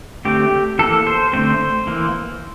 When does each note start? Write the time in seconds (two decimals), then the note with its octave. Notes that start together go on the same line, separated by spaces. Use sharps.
0.25 D3 A3 C4 G4
0.79 E3 A#3 A4
1.07 C5
1.33 D3 A3 C4 C5
1.87 E3 A#3